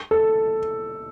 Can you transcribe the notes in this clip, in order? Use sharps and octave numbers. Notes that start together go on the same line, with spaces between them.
A4